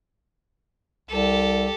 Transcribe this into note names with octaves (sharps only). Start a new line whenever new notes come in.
C2 G4 A4